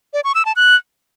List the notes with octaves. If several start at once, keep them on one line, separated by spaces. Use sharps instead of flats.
D5
C#6
E6
A5
F#6